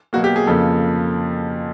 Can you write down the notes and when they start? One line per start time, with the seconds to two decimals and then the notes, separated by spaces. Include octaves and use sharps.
0.13 B2 F#3 A#3 F#4
0.24 G4
0.36 G#4
0.47 F2 C#3 F3 A#3 A4